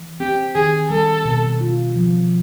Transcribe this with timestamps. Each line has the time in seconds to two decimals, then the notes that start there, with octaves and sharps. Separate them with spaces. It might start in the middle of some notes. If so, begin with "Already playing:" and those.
Already playing: E3
0.20 C4 G4
0.55 D#3 G#4
0.90 G3 A4
1.25 B2
1.61 F4
1.95 F3